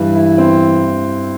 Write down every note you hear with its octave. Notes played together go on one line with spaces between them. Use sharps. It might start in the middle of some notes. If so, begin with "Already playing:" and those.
Already playing: G2 E3
E4
C4